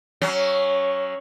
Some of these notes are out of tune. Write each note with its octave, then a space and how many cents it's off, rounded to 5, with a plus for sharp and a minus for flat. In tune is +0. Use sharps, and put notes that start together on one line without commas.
F#3 +20 C#4 +0